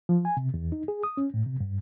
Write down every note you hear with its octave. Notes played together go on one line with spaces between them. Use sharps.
F3
G#5
C3
E2
D#4
G#4
D#6
C#4
A2
C3
G2